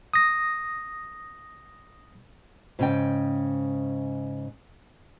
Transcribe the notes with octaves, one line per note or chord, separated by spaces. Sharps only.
D#6 A#6
G#2 C#3 G5